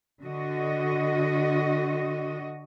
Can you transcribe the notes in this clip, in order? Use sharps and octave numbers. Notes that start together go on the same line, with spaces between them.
D3 F#4 D#5